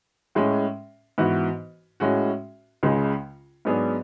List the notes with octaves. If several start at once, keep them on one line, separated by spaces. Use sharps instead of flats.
A2 G#3 C#4
G#2 E3 B3 F#4 B4
A2 G#3 C#4 F#4
C#2 C#3 G#3
G#2 F#3 B3 D4 G#4